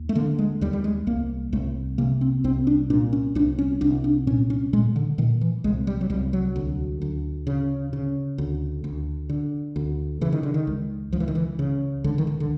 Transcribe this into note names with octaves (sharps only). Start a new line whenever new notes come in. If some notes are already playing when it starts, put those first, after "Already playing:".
Already playing: D#2
A3
D3 A#3
G#3
D#2 G3
G3
G#3
C2 A#3
C2 A3
C3 A#3
C4
C2 C4
D4
A#2 D4
C#4
C2 D4
C#4
C2 D4
D4
A#2 C#4
C#4
A#2 G#3
D3
A#2 D#3
E3
C2 G#3
G3
F#3
C2 G3
F#3
D2
D2
C#3
C#3
D2
D2
D3
D2
C#3 E3
D#3
D3
D#3
C#2
C#2 F3
E3
D#3
E3
C#3
C#2 D3
D#3
D3
D3